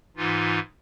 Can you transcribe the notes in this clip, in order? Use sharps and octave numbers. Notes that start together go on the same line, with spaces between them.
G#2 E3 D#4 F4